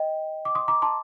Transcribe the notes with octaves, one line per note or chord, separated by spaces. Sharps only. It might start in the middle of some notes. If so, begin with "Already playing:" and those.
Already playing: D#5 G5
D6
C6 D#6
A#5 D6
A5 C6